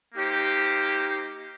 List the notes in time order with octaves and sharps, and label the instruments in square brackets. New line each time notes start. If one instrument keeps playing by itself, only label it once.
[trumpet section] A#3 D#4 G4 C5